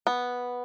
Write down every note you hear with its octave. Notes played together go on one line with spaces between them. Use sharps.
B3